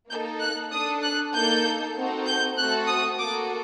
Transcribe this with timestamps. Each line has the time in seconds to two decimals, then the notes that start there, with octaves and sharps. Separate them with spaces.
0.10 A#3 D#4 A4 G6
0.41 F#6
0.72 D4 A4 D#6
1.03 F#6
1.34 A#3 D#4 A4 G6
1.95 C4 D#4 F#4 A4
2.27 G6
2.57 A3 C4 F#4 A4 F#6
2.87 D#6
3.19 A#3 F#4 A4 D6